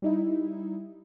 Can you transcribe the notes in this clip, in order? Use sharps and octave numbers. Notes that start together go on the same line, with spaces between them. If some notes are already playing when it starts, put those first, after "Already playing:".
G3 D#4 E4